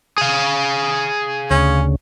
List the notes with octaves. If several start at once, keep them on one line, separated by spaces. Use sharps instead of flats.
G#4 F5
D2 C#3 C#4